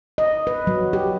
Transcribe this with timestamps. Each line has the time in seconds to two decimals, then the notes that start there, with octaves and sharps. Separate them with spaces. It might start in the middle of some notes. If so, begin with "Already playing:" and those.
0.18 D#5
0.47 B4
0.67 F#3
0.93 G4